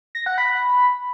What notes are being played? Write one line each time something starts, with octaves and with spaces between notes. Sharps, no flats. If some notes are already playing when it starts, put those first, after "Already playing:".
A#6
F#5
B5